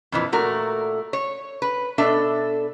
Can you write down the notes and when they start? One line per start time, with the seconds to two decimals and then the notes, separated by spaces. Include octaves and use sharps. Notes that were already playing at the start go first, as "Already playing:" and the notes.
0.12 F2 A#2 E3
0.32 A#2 A3 F#4 A#4
1.13 C#5
1.62 B4
1.98 B2 D4 A4 E5